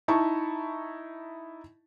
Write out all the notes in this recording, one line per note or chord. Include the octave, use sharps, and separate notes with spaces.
D#4 E4 A5 C#6